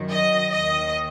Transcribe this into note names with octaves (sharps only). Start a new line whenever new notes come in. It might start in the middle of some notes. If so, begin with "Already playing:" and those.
Already playing: F#2 D#3
D#5
D#2 D#3 D#5